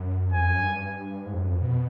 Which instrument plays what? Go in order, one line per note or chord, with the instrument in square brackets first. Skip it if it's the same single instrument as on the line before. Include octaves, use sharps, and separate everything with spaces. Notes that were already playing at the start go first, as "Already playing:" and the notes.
Already playing: [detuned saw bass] F#2
[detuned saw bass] F2 [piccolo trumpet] G#5
[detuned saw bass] F#2
G2
G#2
F2
F#2
F2
B2